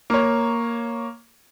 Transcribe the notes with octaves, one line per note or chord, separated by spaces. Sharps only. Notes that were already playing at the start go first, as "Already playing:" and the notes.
A#3 C#5